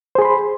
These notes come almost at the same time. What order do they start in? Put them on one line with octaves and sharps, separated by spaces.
C5 G#4 C6 B5